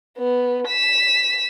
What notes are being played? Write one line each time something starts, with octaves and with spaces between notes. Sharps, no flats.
B3
B6 E7